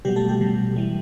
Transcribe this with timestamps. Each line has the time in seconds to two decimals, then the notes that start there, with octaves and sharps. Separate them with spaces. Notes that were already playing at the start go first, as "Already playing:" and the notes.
0.05 B2 F#3 G3 G4
0.16 A3 A4
0.29 G3 G4
0.41 B2 F#3
0.76 E3 G3